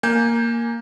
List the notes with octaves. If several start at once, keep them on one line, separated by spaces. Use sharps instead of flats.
A#3 G#5 G6